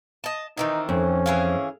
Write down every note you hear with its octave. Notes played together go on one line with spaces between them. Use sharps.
D#5 A5
D#3 E3 C4 D#4
F2 C#4
E3 G#4 F5